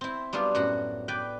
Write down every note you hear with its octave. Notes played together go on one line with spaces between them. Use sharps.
C4 E4
F#3 G3 B3 D4 F4
F#2 A2 F#4 F#5
B4 D5 G5